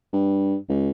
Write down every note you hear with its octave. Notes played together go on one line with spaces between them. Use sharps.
G2
C#2